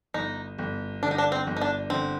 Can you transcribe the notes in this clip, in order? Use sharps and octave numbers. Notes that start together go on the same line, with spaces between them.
G1 D#4
G1
D3 D4
D#4
D4
C4
G1
D#4
D4
D3 C4